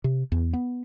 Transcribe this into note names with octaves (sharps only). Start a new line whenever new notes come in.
C3
E2
B3